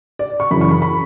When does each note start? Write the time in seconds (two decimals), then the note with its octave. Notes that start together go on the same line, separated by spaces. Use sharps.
0.19 D5
0.40 C#6
0.51 F#2 C#3 E3 B5
0.61 C#6
0.71 B5
0.82 B5